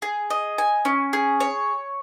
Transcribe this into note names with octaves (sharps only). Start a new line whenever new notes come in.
G#4
D#5
G#5
C#4
G#4
C#5